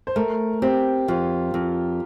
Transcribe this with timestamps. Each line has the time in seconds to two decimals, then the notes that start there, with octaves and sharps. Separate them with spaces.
0.07 C5
0.16 A3 A#4
0.62 C4 G4
1.08 F2 F4
1.54 F2